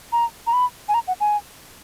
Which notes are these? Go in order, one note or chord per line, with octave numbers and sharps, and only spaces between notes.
A#5
A#5
B5
G#5
A#5
F#5
G#5